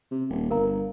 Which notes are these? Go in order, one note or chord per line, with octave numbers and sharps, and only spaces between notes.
C3
D#1
G1 A#4 F5 A#5